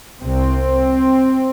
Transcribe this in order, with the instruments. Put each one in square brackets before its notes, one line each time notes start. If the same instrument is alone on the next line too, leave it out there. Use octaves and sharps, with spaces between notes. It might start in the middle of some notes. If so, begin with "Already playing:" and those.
[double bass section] C2 C3 C4